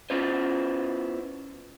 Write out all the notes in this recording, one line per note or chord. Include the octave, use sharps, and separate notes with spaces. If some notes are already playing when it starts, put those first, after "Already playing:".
B3 C#4 E4 F4 B4 C5